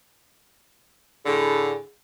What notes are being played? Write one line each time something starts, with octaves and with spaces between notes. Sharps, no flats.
A2 D3 G#4